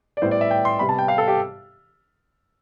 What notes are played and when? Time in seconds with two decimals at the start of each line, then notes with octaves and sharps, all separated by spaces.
0.17 D5
0.22 A2 G3 B3 C5
0.31 D5
0.41 E5
0.51 G5
0.65 C6
0.79 C3 G3 B3 B5
0.89 A5
0.99 G5
1.08 F5
1.18 A4
1.28 G4